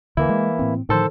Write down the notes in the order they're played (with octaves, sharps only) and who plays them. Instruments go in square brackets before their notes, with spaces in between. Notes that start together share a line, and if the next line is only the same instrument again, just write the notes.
[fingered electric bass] D2 D3 [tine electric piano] E3 A#3 E4
[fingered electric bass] G#3
A2 C4
[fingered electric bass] A2 D3 F3 [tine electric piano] D#3 A4 C5